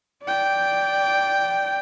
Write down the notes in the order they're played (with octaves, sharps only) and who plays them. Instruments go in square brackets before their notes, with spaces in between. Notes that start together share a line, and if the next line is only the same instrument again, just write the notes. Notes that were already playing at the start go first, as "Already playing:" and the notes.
[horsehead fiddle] D5 G5